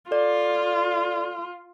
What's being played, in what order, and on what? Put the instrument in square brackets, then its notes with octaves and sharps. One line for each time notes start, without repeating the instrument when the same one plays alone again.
[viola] F4 [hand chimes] A4 D5